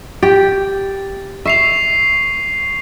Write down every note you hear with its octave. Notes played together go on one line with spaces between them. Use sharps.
G4 A6
E5 C#6 C7 F7